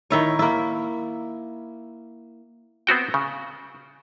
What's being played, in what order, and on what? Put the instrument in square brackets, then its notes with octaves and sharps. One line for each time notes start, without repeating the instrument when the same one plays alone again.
[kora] D#3 E4 C#5
A#3 E4
[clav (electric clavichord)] B3 C4 F#4 G5
C#3